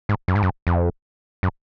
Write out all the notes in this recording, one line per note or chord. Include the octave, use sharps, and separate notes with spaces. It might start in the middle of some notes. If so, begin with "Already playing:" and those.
G#2
F#2
G#2
F#2
F2
F#2